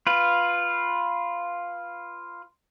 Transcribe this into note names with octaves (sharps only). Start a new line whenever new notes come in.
F4 B4